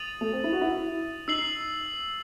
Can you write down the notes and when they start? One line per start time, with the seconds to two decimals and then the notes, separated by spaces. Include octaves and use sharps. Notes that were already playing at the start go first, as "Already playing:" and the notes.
Already playing: D#6 A6 D#7 F#7
0.21 A3
0.33 C4
0.44 E4
0.52 F#4
0.61 E4
1.28 D#4 E6 C7 F#7